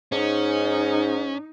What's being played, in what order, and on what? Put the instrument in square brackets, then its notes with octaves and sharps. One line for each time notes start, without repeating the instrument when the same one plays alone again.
[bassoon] G#2 [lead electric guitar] C#4 [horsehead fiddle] D#4